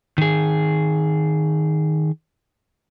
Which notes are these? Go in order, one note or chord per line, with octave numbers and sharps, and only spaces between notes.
D#3 G#4